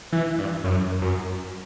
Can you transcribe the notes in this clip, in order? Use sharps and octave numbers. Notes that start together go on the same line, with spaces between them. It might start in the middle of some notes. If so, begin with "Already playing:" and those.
E3
G2
F#2
F#2